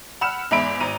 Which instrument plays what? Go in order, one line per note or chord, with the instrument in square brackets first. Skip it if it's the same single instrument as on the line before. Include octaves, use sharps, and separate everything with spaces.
[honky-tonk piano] F#5 B5 E6 F6 E7
E2 G#2 E5 B5 D7
G#1 A#5 D#7